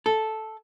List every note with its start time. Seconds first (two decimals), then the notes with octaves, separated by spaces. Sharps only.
0.06 A4